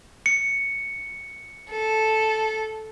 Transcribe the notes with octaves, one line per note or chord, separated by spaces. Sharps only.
C#7
A4